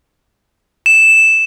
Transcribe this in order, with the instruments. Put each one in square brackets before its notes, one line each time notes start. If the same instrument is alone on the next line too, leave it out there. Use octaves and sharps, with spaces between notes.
[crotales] E7